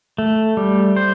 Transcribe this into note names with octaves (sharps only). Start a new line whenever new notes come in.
A3
G3
C5